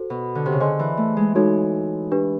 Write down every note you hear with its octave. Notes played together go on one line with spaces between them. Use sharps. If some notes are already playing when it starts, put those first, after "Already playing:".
Already playing: F#4 A4 C5
B2
D3
C3
C#3
D3 G#4 C5 D#5 G#5 C6
E3
A3
G#3
G#3 D#4 F#4 A4 C#5
D4 G4 B4